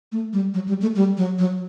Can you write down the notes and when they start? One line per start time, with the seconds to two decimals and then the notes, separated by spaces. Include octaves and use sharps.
0.12 A3
0.33 G3
0.54 F#3
0.68 G3
0.82 A3
0.96 G3
1.18 F#3
1.39 F#3